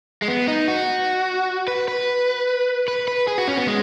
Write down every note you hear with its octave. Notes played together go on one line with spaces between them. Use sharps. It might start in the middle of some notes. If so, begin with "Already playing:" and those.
G#3
B3
D#4
F#4
B4
B4
B4
B4
G#4
F#4
C#4
B3
G#3